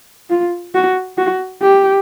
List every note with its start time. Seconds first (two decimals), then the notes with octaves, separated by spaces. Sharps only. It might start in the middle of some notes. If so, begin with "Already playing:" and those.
0.30 F4
0.74 F#4
1.18 F#4
1.62 G4